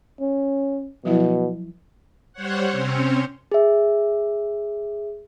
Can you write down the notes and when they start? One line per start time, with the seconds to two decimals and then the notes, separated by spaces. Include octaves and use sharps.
0.21 C#4
1.05 B2 F3 F#3 E4
2.33 G3 C5 C#5 F#5
2.68 C3 C4 C#4 C5 C#5
3.52 G#4 E5